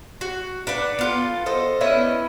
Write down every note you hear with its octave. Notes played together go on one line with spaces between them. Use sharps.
F#4
D4 B4 F#5
B3 F4 A4
A4 C5 D#5
B3 C#4 E4 D#5